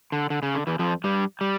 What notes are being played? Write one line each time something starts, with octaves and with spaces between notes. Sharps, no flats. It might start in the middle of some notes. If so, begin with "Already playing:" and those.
D3
D3
C#3
D3
E2 E3
F2 F3
G2 G3
G3